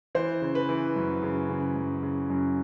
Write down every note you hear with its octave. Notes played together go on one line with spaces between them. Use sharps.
E3 C5
C#3
B4
E3
F#2
C#3
C#3
F#2
C#3
F#2